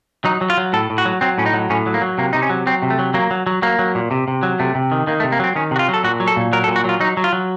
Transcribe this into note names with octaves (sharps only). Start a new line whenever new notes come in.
F#3 D#4
F#3
F4
F#3
A2 A4
A2
F#4
F#3
F#3 C4
A2 C#4
D#4
F#3
A2 C#4
F#3
A#3
F#3
C3 A#3
C3 D#4
C#4
F#3
F#3 C4
C3
A3
F#3
F#3 A#3
F#3
F#3
F#3 A#3
F#3
A#2
C3
C3
F#3
C3 A3
C3
D#3
D#3 A#3
A3
C3
A#3
F#3 C4
D#3 C#4
C3 F#4
F4
F#3
A4
A#2 F#4
F#3
A4
A#2
F#3 A#4
A4
A#2
F#4
F#3 F4
F#3 D#4
F#3
F4
F#3